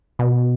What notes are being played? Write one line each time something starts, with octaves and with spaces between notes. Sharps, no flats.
B2